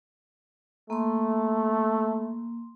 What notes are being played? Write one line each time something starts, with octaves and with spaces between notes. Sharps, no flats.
A3 A#3 C6